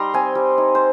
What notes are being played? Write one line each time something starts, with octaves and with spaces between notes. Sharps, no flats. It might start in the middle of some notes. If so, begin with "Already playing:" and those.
Already playing: G3 D#4 A#5 C6
C4 G#5
G3
D#4
C5